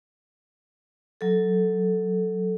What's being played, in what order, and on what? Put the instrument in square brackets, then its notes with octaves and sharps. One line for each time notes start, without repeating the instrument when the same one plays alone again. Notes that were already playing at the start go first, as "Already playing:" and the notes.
[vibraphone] F#3 A4